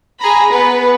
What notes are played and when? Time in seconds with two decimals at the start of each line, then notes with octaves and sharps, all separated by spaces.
0.19 G#4 A#5 B5
0.50 B3 B4